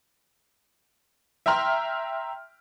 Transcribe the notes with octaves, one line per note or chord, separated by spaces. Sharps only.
E5 G5 A#5 C6 F6